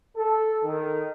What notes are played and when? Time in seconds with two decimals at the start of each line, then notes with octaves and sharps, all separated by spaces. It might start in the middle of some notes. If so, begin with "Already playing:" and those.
0.17 A4
0.64 D#3